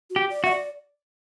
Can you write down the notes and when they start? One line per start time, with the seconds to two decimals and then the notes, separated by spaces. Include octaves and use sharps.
0.10 F#4
0.16 G4
0.30 D5
0.44 F#4 E5
0.51 D5